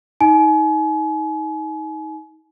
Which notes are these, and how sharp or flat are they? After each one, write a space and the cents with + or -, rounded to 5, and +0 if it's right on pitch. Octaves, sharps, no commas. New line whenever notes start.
D#4 +25 G#5 +35